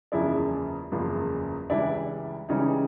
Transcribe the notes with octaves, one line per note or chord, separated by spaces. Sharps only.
F#1 E2 C#3 F3 G#3 D4 E4
F#1 E2 C#3 F3 G#3
C#2 C#3 E3 G3 D4 E4
C#2 C#3 E3 G3 C#4 D#4